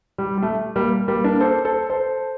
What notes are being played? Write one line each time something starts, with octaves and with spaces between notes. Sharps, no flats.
G3
G3
A3
G3 A#3
G3 A#3
A#3 D4
A4 C5
A4 C5
A4 C5